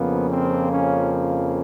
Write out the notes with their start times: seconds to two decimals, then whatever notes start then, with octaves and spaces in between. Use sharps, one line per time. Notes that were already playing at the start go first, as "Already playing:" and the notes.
Already playing: F2 C#3 F3 A#3 B3
0.30 C4
0.71 C#4